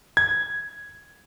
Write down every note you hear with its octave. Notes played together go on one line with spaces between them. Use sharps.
G#6